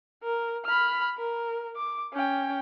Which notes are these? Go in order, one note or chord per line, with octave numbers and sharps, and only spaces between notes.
A#4
B5 F6
A#4
D6
C#4 G5